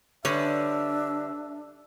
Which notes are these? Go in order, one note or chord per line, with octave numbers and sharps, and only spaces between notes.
D3 G3 D4 B4 C#5 E5